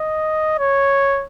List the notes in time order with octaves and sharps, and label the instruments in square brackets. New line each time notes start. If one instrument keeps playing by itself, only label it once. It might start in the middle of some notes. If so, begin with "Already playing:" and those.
Already playing: [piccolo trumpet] D#5
C#5